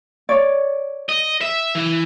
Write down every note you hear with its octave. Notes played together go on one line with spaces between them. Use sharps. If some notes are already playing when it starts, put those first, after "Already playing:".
C#5 D5
D#5
E5
E3